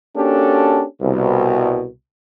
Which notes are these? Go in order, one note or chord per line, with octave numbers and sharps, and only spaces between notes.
A#3 C#4 D4 F#4 G4 A4
C2 B2